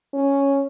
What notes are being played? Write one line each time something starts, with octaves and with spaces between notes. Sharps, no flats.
C#4